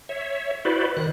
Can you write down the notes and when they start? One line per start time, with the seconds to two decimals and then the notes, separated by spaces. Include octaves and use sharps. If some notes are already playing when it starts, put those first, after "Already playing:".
0.09 C#5 E5
0.65 E4 F#4 B4 C5 D5
0.97 D#3 F#6